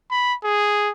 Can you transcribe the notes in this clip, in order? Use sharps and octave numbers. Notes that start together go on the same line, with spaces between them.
B5
G#4